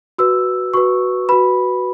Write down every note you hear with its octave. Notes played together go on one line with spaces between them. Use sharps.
F#4 B4 E6
F#4 B4 C#6
F#4 B4 B5